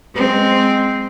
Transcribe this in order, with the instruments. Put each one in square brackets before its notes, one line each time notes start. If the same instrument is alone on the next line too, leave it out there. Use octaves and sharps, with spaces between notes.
[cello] G#3 C4